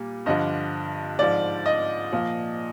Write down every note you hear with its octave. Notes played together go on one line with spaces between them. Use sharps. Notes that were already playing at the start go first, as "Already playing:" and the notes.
Already playing: A#2 G3
G2 D3 F3 D#5
G#2 F3 D5
D#5
A#2 F3